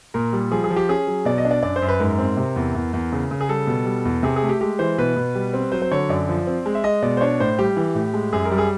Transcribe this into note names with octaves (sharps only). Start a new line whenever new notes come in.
A#2 A#4
G3
F3 G#4
G#4
F3
G4
C#4 G#4
F#3
B2 D5
D#5
D4
D5
F#2 D5
C5
F#2
B4
G#2 A#4
C4
C3
E2
E2
E2
C#3
C#3
G#4
G3 A4
B2
G3
E2
C3 G#4
G#4
A3
G4
G#3 G4
E3 C5
B2 B4
B2
G3
C4
F#3 C5
C5
D3 C#5
F#2 D5
F3
C4
G#3
E5
G#3 D#5
B2 D5
C5
D4 C#5
A2 C5
G3 G4
E3
A2
G#3
F#2 G#4
A#4
G3
G#4